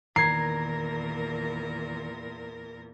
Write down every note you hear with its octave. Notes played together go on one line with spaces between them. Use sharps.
E2 A#2 D#3 A#4 A#5 G#6 C7